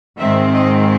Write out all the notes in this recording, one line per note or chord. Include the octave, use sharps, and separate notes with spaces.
G#2 D#3 G#3 C4 E5
D#5